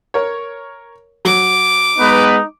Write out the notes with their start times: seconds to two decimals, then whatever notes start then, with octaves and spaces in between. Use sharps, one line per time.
0.14 A#4 C#5
1.25 F#3 D6
1.99 G#3 B3 D#4 B4